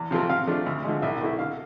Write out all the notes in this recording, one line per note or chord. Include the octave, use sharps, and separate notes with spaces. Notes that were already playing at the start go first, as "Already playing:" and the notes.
Already playing: E2
C3 F3 A3 C4
C3 F5
F3 A3 D4
D2
D3 F3 G#3
C2 E5
B2 A3 E4
D3 F5